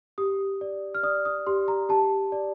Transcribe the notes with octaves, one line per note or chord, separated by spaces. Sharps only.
G4 D#6
D5
F6
D5 D#6
D#6
G4 C6
A#5
G4 A5
D5